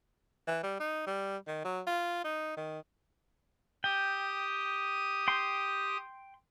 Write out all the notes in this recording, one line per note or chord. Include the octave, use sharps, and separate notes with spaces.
E3
G3
D#4
G3
D#3
F#3
F4
D#4
D#3
G4 G5 D#6
G5 C6